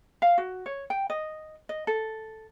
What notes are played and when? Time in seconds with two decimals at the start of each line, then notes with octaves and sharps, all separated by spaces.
0.22 F5
0.38 F#4
0.66 C#5
0.90 G5
1.10 D#5
1.69 D#5
1.87 A4